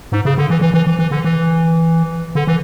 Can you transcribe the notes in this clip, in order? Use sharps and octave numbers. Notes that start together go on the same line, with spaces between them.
G#2
C#3
D3
E3
E3
E3
E3
E3
D3
E3
D3
E3